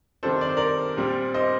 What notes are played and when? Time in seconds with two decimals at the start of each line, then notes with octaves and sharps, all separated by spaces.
0.23 C3 D#3 G3 D4 A4 C5
0.41 D5
0.49 C5
0.57 A#4 D5
0.97 A#2 G3 C4
1.34 C5 D#5